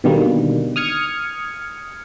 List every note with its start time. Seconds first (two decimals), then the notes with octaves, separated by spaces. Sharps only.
0.04 B2 D3 D#3 G3 A#3
0.76 D#6 F6 G#6 C#7